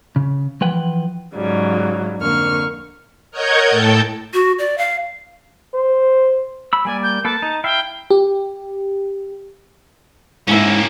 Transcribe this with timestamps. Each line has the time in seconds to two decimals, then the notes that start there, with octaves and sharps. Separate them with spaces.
0.16 C#3
0.61 E3 F3 B4 F#5 G5
1.35 G#2 C#3 F#3 G3
2.18 F2 D3 A#3 C#6 F6
3.31 A#4 C#5 D#5 F#5 G6 G#6
3.70 A2 A4 G5 A5 G6
4.33 F#4
4.59 D5
4.78 F5
5.74 C5
6.73 B5 E6
6.85 G3 A#3 D5 G#5
7.03 G6
7.24 A#3 A4 B4 A5
7.42 D#4
7.64 E4 E5 F5 G5
8.11 G4
10.48 G#2 A#3 C#4 E4